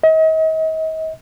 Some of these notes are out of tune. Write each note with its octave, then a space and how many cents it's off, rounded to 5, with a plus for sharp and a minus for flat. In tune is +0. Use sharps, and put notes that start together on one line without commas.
D#5 +40